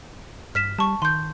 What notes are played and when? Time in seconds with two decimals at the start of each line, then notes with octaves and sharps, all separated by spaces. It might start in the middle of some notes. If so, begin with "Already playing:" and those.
0.55 G2 F6 B6 E7
0.79 G3 A5 C#6
1.02 D#3 C6 G6